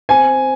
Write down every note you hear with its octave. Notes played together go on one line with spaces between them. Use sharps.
C4 G#5